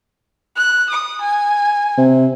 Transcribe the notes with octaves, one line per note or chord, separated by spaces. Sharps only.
F#6
D#6
G#5
C3